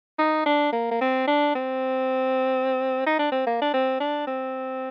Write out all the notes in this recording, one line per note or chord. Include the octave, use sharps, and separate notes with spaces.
D#4
D4
A#3
A#3
C4
D4
C4
D#4
D4
C4
A#3
D4
C4
D4
C4